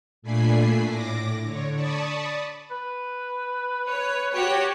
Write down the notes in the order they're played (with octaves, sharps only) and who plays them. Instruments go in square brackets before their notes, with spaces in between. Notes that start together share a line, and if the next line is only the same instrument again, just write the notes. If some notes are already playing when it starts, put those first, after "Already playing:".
[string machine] A#2 A3 D4 G#5 B5 C7
A2 D6 A#6
D3 C#5
D5 A5 B5 C#6 D#6
[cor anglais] B4
[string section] C#5
F#4 G4 C#5